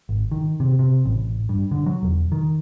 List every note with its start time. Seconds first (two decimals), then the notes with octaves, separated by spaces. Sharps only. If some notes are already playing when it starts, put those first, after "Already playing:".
0.09 G#1
0.32 D#3
0.60 C3
0.79 C3
1.06 A1
1.49 G2
1.71 D3
1.86 F#3
2.03 E1
2.32 D#3